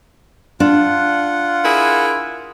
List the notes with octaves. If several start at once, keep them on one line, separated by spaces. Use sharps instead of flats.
D4 F4 F#5
E4 G#4 A#4